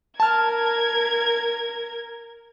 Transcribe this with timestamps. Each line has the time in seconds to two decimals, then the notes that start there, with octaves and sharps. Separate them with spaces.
0.20 A#4 A5 F6 G#6